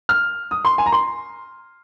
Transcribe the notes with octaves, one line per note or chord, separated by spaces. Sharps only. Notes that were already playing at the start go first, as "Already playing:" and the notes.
F6
D#6
C6
G#5
A#5
C6